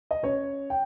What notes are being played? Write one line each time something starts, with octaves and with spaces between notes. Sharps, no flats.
D#5
C#4 C#5
G5